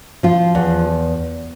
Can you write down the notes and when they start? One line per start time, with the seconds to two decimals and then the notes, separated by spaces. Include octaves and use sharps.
0.23 F3 F4
0.55 E2